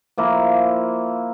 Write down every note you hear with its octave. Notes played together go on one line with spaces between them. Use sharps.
F3 A#3 E4